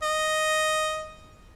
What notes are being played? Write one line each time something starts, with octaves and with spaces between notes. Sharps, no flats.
D#5